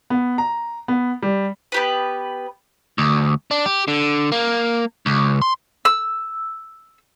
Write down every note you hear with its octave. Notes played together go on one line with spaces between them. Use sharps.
B3
A#5
B3
G3
B3 G4 B4
D2
D4
G4
D3
A#3
C#2
C6
E6